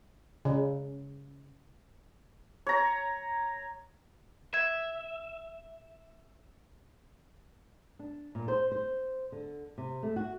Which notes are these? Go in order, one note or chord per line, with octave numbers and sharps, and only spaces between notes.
C#3
C#5 A#5
E5 G#6
D4
A#2
C5
C5
D3
C3
A3
F#4